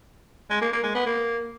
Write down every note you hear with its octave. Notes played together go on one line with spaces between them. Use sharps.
G#3
A#3
A#3
G#3
B3
A#3